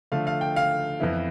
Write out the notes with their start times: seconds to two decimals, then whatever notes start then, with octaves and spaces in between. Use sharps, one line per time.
0.12 D3 F3 A3 F5
0.27 F5
0.41 G5
0.56 F5
1.00 F2 E3 B3 E4